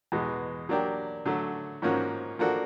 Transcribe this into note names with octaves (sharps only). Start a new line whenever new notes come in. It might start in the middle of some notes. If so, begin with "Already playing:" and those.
E2 B2 G#3
F#3 A#3 D4 G4
D3 F#3 A3
G#2 F3 A#3 C#4 F#4
F3 A#3 D4 F#4 A4